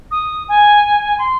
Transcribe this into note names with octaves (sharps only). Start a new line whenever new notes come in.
D#6
G#5
C6